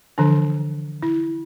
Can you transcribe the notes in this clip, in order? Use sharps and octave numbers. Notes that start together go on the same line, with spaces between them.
D3 E3 F3 D4
E4